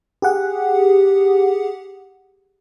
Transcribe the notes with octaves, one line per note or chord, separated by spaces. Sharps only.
G4 G#4 F#5